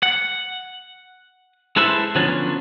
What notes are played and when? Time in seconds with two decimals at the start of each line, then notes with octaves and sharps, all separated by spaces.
0.03 F#5
1.76 G#3 E4 A4 B4 C5 E5
2.15 D3 F3 F#3 B3 C#4 D4